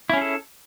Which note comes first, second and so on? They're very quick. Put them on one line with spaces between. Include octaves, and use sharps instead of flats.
E4 C#4 G#4 A4